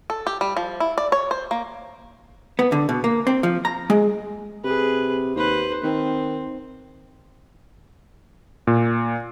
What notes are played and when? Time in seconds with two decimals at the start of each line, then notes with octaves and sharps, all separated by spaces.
0.10 A4
0.27 G4
0.41 G3
0.57 F3
0.80 E4
0.98 D5
1.12 C#5
1.31 C5
1.51 A#3
2.59 B3
2.72 D3
2.89 B2
3.04 A#3
3.27 C4
3.43 F3
3.65 A#5
3.90 G#3
4.64 C3 G#4 B4
5.36 D#2 B4 C5
5.84 D#3 C4
8.67 A#2